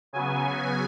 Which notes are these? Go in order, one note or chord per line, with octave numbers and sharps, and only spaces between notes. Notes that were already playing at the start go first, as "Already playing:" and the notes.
C#3 F#3 B3 G#5